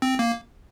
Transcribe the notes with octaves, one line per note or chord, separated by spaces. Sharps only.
C4
A#3